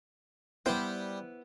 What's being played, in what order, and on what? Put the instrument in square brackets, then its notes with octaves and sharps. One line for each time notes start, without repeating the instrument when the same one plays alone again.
[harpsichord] G3 G5 [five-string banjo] B3 E4 C5